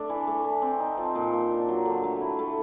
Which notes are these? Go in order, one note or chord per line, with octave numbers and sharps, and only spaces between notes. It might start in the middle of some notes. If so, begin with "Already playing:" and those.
Already playing: A3 D4
E3
A3
E3
C4
D#4
F3
A#2
A#3
D4
F#3
D3
A3
E4
A3